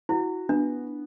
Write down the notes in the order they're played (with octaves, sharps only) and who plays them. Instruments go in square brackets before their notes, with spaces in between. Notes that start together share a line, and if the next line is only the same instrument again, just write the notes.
[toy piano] E4 [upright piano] F#4
[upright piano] B3 [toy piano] D4